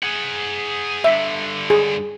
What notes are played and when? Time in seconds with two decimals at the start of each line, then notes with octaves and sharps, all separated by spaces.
0.03 G#4 F#5
1.04 G2 D3 E5
1.70 G#4